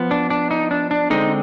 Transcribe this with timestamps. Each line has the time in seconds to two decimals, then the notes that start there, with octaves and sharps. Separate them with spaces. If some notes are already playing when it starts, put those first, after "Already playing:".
Already playing: F3 B3
0.11 D4
0.30 D4
0.51 D#4
0.71 D4
0.91 D4
1.10 D3 G#3 C4 D#4